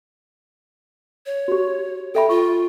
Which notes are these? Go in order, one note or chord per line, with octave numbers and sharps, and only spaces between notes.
C#5
F#4 G4
A4 E5 G5 B5
F4 C#6